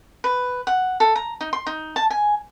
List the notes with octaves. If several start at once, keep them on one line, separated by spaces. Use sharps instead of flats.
B4
F#5
A4
A#5
D#4
C6
D#4
A5
G#5